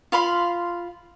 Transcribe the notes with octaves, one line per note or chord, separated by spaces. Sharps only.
F4 F5 B5 C6